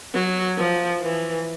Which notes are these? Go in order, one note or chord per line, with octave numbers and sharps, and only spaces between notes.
F#3
F3
E3